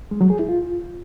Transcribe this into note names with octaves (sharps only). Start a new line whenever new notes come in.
G#3
F#3
G#4
E4
F4